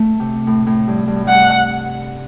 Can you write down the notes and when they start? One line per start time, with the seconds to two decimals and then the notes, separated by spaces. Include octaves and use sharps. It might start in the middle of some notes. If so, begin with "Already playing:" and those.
Already playing: A3
0.20 C3
0.47 A2
0.67 A2
0.88 G2
1.07 G2
1.16 A2
1.25 G2 F#5